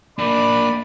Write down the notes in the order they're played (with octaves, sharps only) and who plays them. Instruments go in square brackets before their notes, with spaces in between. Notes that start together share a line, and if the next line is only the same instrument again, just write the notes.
[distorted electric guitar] A#3 D4 [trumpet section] D5 B5